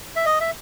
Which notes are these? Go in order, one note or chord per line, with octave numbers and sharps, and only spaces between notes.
E5
D#5
E5